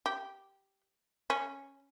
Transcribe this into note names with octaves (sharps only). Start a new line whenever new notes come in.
G4
C#4